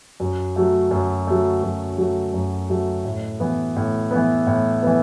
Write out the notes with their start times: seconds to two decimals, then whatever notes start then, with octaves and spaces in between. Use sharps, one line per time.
0.20 F#2
0.56 F#3 A3
0.91 F#2
1.27 F#3 A3
1.63 F#2
1.98 F#3 A3
2.34 F#2
2.70 F#3 A3
3.05 A2
3.40 E3 B3
3.76 A2
4.11 E3 B3
4.47 A2
4.83 E3 B3